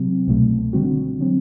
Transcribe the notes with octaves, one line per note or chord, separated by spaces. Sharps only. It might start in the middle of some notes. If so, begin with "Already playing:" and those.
Already playing: C3 F#3 C4
C2 B2 A3
D3 G3 C4 F#4
D3 F#3 C4